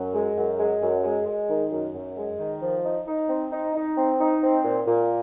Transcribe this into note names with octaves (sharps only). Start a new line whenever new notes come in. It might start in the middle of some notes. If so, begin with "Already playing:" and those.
Already playing: F#2
G#3
F#2
G#3
F#2
G#3
G#3
D#3
F#2
F#2
G#3
D#3
F3
D#4
D#4
C4
D#4
D#4
C4
D#4
C4
A#2
A#2